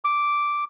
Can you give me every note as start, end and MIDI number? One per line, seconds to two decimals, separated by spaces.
0.05 0.64 86